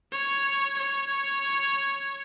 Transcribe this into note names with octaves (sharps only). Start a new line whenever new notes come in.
C#5
C#5